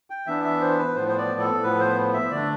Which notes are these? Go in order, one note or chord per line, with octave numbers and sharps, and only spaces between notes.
G5
E3 B3 D4 E5
E5
C5
B4
A2 F3 B3 C5
C5
D5
A4
A2 F3 B3 B4
C5
E5
D3 A3 D4 D5